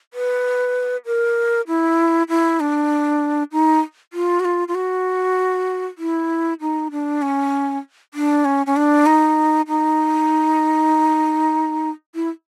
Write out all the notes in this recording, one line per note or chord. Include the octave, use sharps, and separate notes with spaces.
B4
A#4
E4
E4
D4
D#4
F4
F#4
F4
F4
F#4
E4
D#4
D4
C#4
D4
C#4
C#4
D4
D#4
D#4
E4